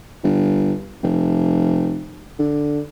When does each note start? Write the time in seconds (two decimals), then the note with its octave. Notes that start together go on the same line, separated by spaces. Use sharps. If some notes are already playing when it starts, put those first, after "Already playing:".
0.24 G1
1.03 F1
2.39 D3